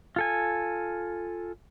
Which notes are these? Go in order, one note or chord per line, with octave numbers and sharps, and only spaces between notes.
F4 A4 G#5